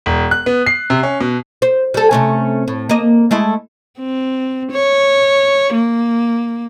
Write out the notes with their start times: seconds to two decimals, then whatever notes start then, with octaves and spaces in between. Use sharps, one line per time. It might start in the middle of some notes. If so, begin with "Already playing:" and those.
0.06 E1
0.31 F#6
0.46 B3
0.66 C7
0.90 C3
1.03 C#4
1.21 B2
1.62 C5
1.94 G3 A4
2.11 C3 A3 C#4
2.68 A2
2.89 A#3 D#5
3.31 G#3 A3 E4
3.99 C4
4.72 C#5
5.73 A#3